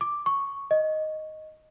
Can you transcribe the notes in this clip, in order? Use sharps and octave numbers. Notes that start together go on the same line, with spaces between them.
D6
C#6
D#5